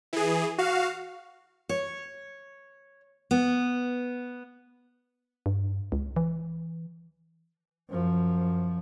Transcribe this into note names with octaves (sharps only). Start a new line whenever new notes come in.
E3 G#4
F#4 F5
C#5
B3
G2
C#2
E3
F#2 F3